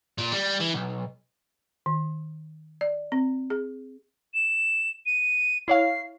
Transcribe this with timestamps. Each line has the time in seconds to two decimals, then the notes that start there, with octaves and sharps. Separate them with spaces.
0.18 A#2
0.32 G3
0.60 E3
0.74 B1
1.86 D#3
2.81 D5
3.12 C4
3.50 G#4
4.34 E7
5.06 D#7
5.68 E4 C#5 F5 C7